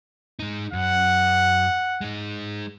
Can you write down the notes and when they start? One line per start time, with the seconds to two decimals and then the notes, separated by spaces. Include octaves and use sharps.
0.39 G#3 D#4
0.73 F#2 F#5
2.01 G#3 D#4